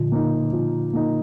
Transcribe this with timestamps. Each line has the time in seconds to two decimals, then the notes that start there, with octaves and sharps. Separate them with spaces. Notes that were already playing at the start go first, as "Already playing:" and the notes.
Already playing: A#2 D3 F3
0.12 A#3 D#4
0.53 F3
0.93 A#3 D#4